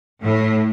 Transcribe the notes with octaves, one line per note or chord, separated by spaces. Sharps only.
A2